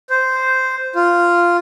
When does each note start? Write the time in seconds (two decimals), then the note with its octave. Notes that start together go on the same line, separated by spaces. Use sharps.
0.10 C5
0.95 F4